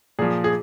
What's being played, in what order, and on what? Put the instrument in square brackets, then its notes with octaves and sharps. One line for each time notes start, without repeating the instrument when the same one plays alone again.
[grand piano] A#2 F3 G#4
G#4